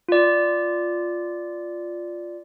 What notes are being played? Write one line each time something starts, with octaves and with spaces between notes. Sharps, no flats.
F4 D5